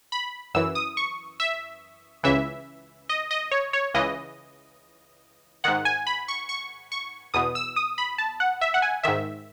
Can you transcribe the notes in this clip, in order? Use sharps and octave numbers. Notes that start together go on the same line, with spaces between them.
B5
F#2 E3 E6
D#6
C#6
E5
C#2 C#3 E3 E5
D#5
D#5
C#5
C#5
C#2 C#3 E3 D#5
G#2 D#3 F#5
G#5
B5
C#6
C#6
C#6
E2 B2 D#6
E6
D#6
B5
A5
F#5
E5
F#5
G#5
G#2 D#3 E5